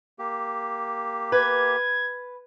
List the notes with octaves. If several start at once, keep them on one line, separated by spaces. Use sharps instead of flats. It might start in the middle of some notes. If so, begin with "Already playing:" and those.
A#3 G4
B4 G#6